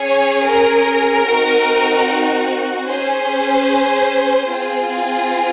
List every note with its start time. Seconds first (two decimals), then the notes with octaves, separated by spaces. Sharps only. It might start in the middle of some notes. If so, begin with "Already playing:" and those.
Already playing: C#4 G#4 C#5
0.46 A#4
1.26 C4 D#4 F#4
2.87 C#4 G#4 C5
4.48 C4 F4 G#4